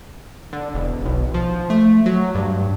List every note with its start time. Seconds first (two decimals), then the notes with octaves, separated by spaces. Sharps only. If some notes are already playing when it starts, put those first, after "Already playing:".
0.53 D3
0.74 E1
1.05 B1
1.34 F3
1.70 A3
2.06 F#3
2.35 G2